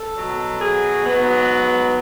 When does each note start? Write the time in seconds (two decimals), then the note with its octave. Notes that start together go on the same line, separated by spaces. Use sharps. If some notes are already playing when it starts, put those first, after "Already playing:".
Already playing: A4
0.17 B2 F#3
0.60 G#4
1.03 G#2 F#3 B3